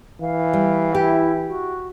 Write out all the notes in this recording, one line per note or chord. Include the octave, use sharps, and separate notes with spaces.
E3 F5
G3
E4 G4
F#4